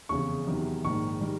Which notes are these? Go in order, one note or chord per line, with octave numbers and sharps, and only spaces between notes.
F1 E2 C#3 C#6
E2 C3 D#3 F#3
A#1 G#2 D#3 C#6
D#3 G3